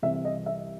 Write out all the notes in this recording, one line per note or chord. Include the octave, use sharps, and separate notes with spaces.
C2 C3 E3 G3 C4 E5
D#5
E5